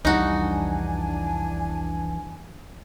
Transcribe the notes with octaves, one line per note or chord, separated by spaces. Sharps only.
C2 F2 E3 G3 D4 D#4 F#4 G#5